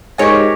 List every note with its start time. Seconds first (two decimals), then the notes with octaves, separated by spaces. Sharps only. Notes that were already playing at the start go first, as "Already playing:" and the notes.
0.18 G#2 G4 A#4 C#5 G#5